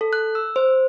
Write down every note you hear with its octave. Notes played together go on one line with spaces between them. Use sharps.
A4
F#6
E6
C5